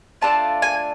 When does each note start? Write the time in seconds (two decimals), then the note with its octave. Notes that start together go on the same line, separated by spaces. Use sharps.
0.22 A3 D4 F4 A5
0.62 G#5